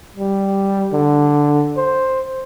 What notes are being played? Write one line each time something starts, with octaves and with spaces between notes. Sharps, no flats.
G3
D3
C5